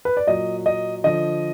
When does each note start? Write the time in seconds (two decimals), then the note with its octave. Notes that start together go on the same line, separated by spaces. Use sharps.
0.05 B4
0.17 D5
0.27 A#2 F#3 D#5
0.66 D#5
1.04 D3 F3 D#5